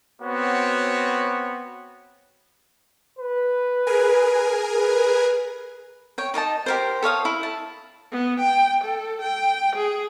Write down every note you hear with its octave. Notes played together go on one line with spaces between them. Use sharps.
B3 C4 F#4 C#5
B4
G#4 A#4 G#5
B4
C#5 G5
D#4 D5 D#5 A5
G4 A#4 C5
A4 C#5 F5 D#6
E4
A5
B3
G5
A4
G5
G#4